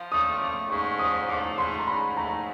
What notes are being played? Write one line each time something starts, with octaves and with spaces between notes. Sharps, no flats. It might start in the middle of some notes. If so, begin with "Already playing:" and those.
Already playing: F3
A3 D#6
A3 D6
G#2 C#6
F3 D#6
A3 D6
G#2 C6
A#5
G#2 B5
A3 A#5